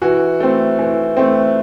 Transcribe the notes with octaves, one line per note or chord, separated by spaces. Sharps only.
E3 F#4
A3 C4
E3
A3 C4